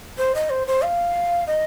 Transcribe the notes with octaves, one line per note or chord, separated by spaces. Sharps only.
C5
D#5
C5
C5
F5
D#5